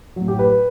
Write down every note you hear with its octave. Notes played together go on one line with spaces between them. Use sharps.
A2 F#3
G4
B4